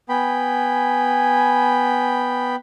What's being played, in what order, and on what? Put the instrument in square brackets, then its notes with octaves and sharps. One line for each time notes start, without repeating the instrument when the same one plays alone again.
[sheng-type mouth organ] B3 G5 B5 [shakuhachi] G#5